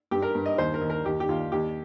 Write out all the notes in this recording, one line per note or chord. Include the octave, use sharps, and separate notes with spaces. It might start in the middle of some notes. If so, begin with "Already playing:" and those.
G2 G4
A#4
G2
D#5
D#2 C5
A#4
D#2
A#4
D#2 G4
G4
D#2 F4
D#2 G4